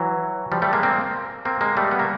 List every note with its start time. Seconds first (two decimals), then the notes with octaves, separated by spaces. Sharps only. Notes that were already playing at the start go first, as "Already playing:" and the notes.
Already playing: E3 F#3
0.52 F3 G3
0.62 G3 A3
0.73 G#3 A#3
0.83 A#3 C4
1.45 A#3 C4
1.61 G#3 A#3
1.77 G3 A3
1.91 B3
1.99 A#3